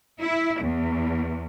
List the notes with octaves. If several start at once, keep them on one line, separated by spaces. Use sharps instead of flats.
E4
E2